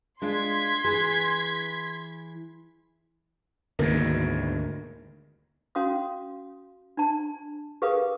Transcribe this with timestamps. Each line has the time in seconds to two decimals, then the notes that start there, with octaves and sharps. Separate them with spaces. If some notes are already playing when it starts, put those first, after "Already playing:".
0.22 G#3 D4 F4 C6 G#6 B6
0.84 E3 G#4
3.79 D2 G#2 B2 D#3 A#3
5.75 C#4 F#4 F5 C6 D#6
6.97 D4 A5
7.82 G4 G#4 A#4 B4 F5 D#6